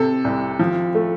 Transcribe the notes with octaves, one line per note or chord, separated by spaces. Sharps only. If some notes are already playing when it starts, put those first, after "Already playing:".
Already playing: C3 A4
C2
F3
A3